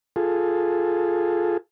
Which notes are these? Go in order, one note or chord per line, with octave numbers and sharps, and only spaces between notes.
F4 G#4 A4